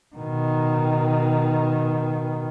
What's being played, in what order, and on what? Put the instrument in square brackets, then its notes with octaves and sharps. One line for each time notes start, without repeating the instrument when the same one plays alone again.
[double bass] B2 D#3